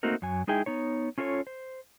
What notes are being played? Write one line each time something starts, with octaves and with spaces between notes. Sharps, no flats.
A3 A#3 C4 D#4 F#4 A#4
F#2 F#3 G#5
G#3 D#4 E4 G#4 G5
B3 D#4 C#5
C#4 F4 A4 B4 C#5
C5